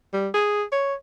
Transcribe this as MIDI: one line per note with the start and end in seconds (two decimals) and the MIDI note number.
0.13 0.28 55
0.34 0.63 68
0.72 0.94 73